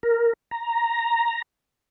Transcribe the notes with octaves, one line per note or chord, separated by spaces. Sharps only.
A#4
A#5